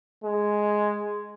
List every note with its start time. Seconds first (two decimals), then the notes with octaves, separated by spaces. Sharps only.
0.24 G#3